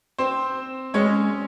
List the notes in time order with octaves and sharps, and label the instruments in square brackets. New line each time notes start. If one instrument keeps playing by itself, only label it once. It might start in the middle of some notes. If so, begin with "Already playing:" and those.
[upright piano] C4 C5
[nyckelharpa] G#3 [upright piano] C#4 C#5